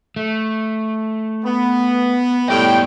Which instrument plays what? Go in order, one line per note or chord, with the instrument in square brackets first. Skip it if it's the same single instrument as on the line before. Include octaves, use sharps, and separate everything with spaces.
[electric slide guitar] A3
[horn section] B3
[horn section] A2 G3 G5 [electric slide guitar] B3 D5 D#5